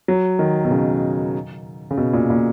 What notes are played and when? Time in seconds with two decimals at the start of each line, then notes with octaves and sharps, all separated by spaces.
0.08 F#3
0.39 D#3
0.64 B2
0.71 C#3
1.91 C#3
1.97 B2
2.13 A#2
2.30 A#2